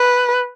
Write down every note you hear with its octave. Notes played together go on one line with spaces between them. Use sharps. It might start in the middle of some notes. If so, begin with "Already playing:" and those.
Already playing: B4